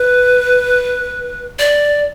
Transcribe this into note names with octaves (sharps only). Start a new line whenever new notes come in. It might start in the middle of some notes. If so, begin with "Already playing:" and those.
Already playing: B4
D5